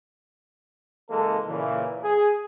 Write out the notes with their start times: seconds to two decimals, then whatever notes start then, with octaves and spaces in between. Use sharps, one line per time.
1.10 F#1 E3 G#3 A#3 A4
1.48 A#2 C#3 E3
2.02 G#4